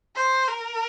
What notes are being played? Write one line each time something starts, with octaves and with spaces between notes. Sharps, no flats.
C5
A#4